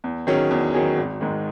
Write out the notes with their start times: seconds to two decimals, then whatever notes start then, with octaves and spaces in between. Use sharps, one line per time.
0.04 E2
0.27 D#3 F#3 C#4 G#4
0.51 E2
0.74 D#3 F#3 C#4 G#4
0.97 G#1
1.21 G#2 D#3 G#3